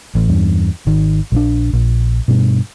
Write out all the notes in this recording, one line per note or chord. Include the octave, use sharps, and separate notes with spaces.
A1
E2 G2
G#1 D#3
A#1 E3 D4
A#1
G2 B2